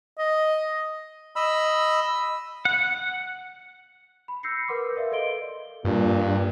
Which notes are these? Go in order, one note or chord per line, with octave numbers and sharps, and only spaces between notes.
D#5
D#5 B5 E6
F#5
B5
E6 G6 A#6 C7 C#7
A#4 B4 F#5 C6 D6
A#4 D5 E5 F5
A4 B4 D#5 C6 D7 G7
G2 A#2